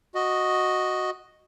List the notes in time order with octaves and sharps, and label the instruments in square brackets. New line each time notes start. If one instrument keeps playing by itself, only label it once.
[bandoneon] F#4 D#5